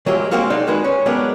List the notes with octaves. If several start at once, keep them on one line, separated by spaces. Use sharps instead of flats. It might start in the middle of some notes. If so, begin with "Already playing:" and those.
F#3 G#3 A#3 F4 G4 E5
G#3 A#3 C4 F#4 F5
C2 D4 D#4 A#4 F5 C6
D#3 G#3 F#4 G#4 B4
C#4
F#3 G#3 B3 D4 G4 A#4